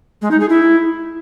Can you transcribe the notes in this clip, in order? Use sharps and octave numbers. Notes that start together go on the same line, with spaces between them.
G#3
D#4
G#4
E4